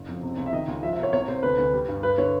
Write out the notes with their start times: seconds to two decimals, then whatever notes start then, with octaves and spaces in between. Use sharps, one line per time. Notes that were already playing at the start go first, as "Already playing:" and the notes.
Already playing: F#1
0.08 F2
0.23 C3
0.38 C#2
0.46 E5
0.53 D#3 D#5
0.68 C#2
0.83 F3 E5
0.93 E5
0.98 C2 C#5
1.13 C3 C#5
1.28 C3 C5
1.43 D2 B4
1.58 D2
1.73 G3
1.88 G2
2.03 G2 B4
2.18 D3 C#5